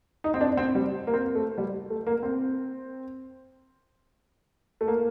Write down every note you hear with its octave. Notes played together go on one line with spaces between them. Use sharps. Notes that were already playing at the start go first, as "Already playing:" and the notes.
D#4
C4
D4
C4
G3
A#3
C4
A3
G3
A3
A#3
C4
A3
A#3